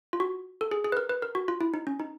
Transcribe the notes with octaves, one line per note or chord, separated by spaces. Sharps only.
F4
F#4
A4
G#4
G#4
B4
A#4
B4
A#4
F#4
F4
E4
D#4
C#4
D#4